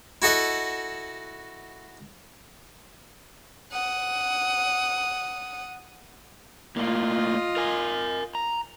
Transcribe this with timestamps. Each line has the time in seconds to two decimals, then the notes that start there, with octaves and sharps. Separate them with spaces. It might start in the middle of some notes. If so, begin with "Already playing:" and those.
0.22 E4 F#4 A4 D#5 E5 F#5
3.72 F#5 D#6
6.76 A2 A#3 F4 D#5
7.57 A#4 G#5
8.35 A#5